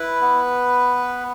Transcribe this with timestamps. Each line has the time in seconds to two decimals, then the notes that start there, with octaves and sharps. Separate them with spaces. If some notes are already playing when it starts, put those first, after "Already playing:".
Already playing: E4 B4
0.21 B3